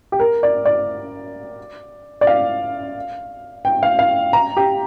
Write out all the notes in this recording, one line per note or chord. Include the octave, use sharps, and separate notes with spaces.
G4
A#4
D5
D5
D5
F5
G5
F5
F5
A#5
G4